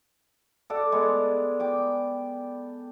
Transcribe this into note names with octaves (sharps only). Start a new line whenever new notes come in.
A4 D5 F#5
G#3 B3
G5 D6